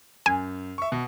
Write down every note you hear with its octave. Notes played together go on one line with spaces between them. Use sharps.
F#2 G#5
E5 C#6
B2